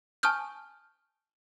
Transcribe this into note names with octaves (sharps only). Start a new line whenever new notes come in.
G#5 A5 C#6 D#6 F6 G6